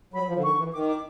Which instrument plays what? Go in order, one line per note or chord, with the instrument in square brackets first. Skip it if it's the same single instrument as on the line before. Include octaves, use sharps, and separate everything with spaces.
[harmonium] F#3 [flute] B5
[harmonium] F3
D3
[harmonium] D#3 [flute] C#6
[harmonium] E3
[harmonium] D#3 [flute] D6
[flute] D6